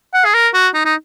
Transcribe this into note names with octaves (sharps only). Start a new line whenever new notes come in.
F#5
G#4
A#4
F#4
D#4
D#4